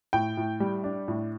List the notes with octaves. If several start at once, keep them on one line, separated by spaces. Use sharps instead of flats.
A2 G5
A2
G3
D4
A2